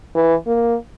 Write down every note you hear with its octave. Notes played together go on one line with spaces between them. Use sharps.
E3
A#3